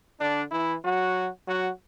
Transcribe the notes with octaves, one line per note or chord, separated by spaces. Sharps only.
D3 D4
E3 E4
F#3 F#4
F#3 F#4